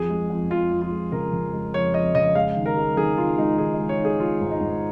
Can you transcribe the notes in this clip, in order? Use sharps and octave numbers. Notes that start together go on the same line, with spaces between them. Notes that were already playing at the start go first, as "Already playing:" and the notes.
Already playing: F2 G#4
G#3
F2
F2 F4
F2
F4
G#3
C#3 A#4
C#3
G#3
F2 C#5
F2 D#5
C#3 D#5
G#3 F5
D#3
A#4
G#3
D#3 G#4
D#3 F4
G#3 D#4
D#3 G#4
D#5
G#3
C#5
D#3 G#4
G#3 F4
G#2
D#4
G#2